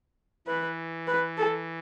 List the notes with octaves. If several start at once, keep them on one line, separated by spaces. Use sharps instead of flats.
E3 B4
B4
A4